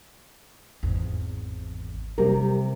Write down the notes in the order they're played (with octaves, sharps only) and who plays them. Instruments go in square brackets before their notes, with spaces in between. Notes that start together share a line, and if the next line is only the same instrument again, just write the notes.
[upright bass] G#1 E2
[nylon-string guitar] C3 G4 A#4 [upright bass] G3 C#4